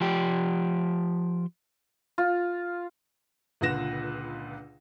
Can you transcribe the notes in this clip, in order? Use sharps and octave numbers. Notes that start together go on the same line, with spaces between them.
F3 G4
F4
C#2 A#2 D3 B4 A#6 E7